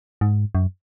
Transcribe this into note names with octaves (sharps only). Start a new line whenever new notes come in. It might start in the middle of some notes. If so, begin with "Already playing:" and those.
G#2
F#2